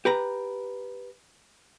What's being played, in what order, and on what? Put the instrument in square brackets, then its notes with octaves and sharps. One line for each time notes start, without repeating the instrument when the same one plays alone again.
[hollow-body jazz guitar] G4 B4 A#5